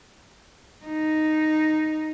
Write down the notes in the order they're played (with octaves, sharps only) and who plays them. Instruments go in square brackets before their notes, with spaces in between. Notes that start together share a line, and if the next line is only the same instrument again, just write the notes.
[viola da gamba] D#4